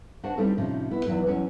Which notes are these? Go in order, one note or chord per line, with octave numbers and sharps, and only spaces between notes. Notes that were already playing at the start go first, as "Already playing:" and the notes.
D4 F#4 C5 F#5 A5
G3 C4 D#4 E4 A4
A2 C3 F3 C#4 D#4
B3 E4
E2 D#3 F#3 E4 B4
E2 C#3 F#3 C#4 E4 C#5